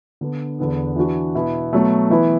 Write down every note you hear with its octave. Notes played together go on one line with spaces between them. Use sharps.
D3 B3 D4
E2 D3 B3 D4
E3 D4 F#4
B2 B3 E4
B2 F#3 A3
E3 B3 E4